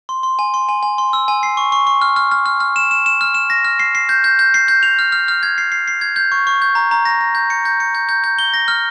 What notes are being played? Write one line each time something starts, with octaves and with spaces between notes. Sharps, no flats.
C6
C6
G#5
C6
G#5
G#5
C6
E6
G#5
C7
C#6
C#6
C#6
F6
F6
F6
F6
F6
E7
E7
E7
F6
E7
A#6
F6
C7
C7
G6
G6
G6
C7
G6
F7
F6
F6
F6
G#6
C7
C7
C7
G#6
G6
C#6
C#6
G6
A#5
A#5
A#6
A#6
G6
C#7
G6
C#7
G6
G6
G6
G7
A#6
F6